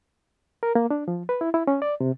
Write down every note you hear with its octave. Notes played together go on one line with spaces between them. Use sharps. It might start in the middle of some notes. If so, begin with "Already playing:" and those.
A#4
A#3
D4
F3
B4
E4
E4
C#4
D5
C3